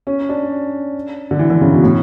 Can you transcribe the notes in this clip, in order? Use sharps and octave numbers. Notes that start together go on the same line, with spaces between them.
C#4
D4
D3
E3
D3
C#3
B2
A2